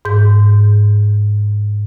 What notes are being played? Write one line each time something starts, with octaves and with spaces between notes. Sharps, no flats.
G#2 G6